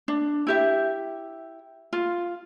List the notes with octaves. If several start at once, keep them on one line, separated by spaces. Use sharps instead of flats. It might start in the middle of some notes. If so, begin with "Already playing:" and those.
D4
E4 G4 E5
F4